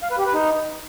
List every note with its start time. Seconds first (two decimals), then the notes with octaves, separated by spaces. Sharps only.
0.03 F5
0.11 B4
0.18 G4
0.26 B4
0.34 D#4